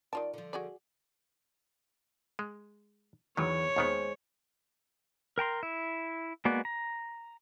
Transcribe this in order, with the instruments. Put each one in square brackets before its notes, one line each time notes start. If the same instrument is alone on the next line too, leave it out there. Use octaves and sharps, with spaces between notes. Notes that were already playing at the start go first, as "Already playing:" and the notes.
[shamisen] D#3 F4 A5 [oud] D5
[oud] D3 F3
[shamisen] F#4 G#4 D5
[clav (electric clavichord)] G#3
[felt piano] E2 [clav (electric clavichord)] D#3 E3 F#3 [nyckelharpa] C#5
[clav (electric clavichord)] D#2 D#3 B3 [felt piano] G#3 C5
[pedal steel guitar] A#4 G5 A#5 C6
E4 E5
G#3 A#3 B3 F#4 D5
A#5